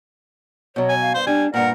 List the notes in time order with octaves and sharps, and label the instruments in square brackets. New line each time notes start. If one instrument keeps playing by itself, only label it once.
[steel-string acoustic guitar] B2 F#3 [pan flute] C#5
[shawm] G#5
[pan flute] F5
[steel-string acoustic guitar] G2 [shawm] C5
[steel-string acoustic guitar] G3 [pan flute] D4 [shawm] G#5
[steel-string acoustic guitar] G2 A#2 [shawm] A#4 [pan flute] F#5